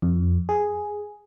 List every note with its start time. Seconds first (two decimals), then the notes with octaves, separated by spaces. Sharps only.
0.02 F2
0.49 G#4